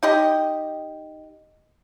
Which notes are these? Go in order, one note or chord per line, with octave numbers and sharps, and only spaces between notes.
D#4 G4 D#5